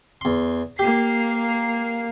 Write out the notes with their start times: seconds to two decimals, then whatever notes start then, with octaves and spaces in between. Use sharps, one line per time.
0.21 E2 C6
0.79 A#3 G4 C7